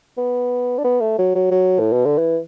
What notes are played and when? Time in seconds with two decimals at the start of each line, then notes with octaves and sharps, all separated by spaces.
0.18 B3
0.78 D4
0.84 B3
1.01 A3
1.18 F#3
1.35 F#3
1.51 F#3
1.79 A2
1.92 B2
2.05 D3
2.18 E3